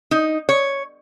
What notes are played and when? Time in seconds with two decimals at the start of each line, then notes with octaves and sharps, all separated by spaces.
0.11 D#4
0.49 C#5